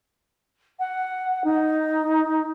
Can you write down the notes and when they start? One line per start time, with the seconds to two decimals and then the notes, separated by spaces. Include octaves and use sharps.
0.80 F#5
1.44 D#4